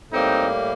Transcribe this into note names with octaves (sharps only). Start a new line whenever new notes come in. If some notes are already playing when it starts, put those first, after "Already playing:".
A2 G3 A#3 C4 D#4